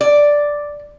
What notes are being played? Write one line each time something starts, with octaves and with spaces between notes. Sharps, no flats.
D5